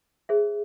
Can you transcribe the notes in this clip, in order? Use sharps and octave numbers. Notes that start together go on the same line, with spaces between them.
G#4 C5 E5